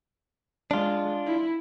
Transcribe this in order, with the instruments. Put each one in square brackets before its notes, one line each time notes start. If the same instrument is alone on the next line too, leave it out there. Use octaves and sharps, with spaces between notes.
[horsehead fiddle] G#3 [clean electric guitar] D4 F4
[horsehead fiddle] E4